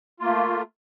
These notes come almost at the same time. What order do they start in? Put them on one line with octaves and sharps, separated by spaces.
F4 A#3 A3